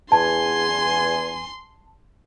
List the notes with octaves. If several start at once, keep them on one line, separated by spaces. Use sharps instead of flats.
E2 G#5 A5 C6